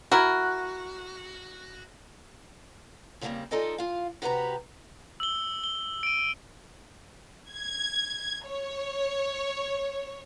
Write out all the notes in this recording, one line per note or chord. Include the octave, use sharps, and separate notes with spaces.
E4 F#4 A#4
C#3 F3 G3 A3 A#3 C4
D#4 F4 A4 D5 D#5 G#5
F4 F5
C3 F#4 G4 B4 C#5 A#5
E6 G7
G7
D7 D#7
G#6
C#5